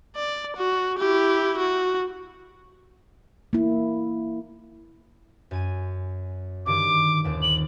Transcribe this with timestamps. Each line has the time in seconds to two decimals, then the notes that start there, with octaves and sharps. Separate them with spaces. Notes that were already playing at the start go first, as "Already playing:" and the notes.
0.16 D5
0.57 F#4
0.98 E4 G4
1.58 F#4
3.53 A#3 E4
5.51 F#2 G#5 D#7
6.66 G2 D3 D#3 D6
7.24 D#1 D#2 C4
7.42 F#7